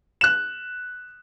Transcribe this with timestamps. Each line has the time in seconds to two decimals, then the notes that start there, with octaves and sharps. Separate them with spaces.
0.21 F#6 E7